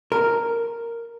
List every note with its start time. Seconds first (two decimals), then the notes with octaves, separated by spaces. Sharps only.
0.12 A#4